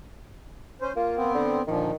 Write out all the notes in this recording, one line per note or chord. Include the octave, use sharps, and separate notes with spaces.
C#4 C5
A#3 F4
B3 C4
D3
A#2 D3 D#3 F3